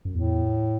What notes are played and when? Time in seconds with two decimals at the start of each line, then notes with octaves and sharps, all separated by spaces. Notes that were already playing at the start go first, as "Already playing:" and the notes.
0.05 F#2
0.14 E2 A2